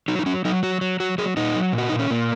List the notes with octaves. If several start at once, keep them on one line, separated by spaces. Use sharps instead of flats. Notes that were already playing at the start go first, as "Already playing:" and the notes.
F#3 D#4
D#4
F#3 C#4
F#3 D#4
F#3 F#4
F#3
F#3 F#4
F#3 G#4
A#2 D#4
F#3
A#2
F#4
A#2 D#4
C#4
A#2 A#3